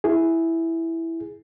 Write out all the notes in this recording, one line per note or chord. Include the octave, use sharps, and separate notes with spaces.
E4 G#4